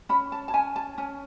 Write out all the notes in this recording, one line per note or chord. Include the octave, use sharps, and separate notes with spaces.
C#4 B5
A5
A5
C#4 G#5
A5
C#4 G#5